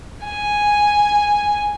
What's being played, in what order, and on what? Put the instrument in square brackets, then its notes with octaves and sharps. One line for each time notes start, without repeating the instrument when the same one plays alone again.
[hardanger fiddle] G#5